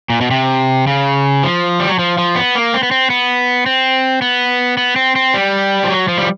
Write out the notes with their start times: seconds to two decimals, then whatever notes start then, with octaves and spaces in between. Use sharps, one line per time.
0.10 A#2
0.21 B2
0.31 C3
0.87 C#3
1.43 F3
1.80 G3
1.89 F#3
1.99 F3
2.18 F3
2.36 B3
2.55 A#3
2.74 C4
2.83 B3
2.91 C4
3.10 B3
3.66 C4
4.22 B3
4.77 B3
4.96 C4
5.16 C4
5.34 G3
5.84 F3
5.90 F#3
6.08 F3
6.18 G3